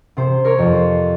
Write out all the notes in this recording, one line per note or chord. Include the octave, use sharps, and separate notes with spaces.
C3 C5
A#4 C#5
F2
C5